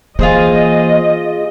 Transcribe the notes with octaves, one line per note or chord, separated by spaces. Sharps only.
E3 A#3 F4 G#4 C5 D#5